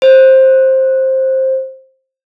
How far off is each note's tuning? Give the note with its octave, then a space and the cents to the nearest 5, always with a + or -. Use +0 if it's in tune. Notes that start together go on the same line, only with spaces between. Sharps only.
C5 +15